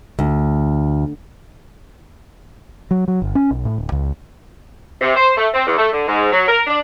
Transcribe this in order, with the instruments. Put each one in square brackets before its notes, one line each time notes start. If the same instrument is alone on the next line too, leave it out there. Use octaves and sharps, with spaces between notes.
[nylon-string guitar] D2
[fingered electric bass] F#3
F#3
G1
C#4
B1
A2
D1
C#2
[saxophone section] C3
C5
A3
C4
E2
A3
D3
G#2
F#3
A#4
D4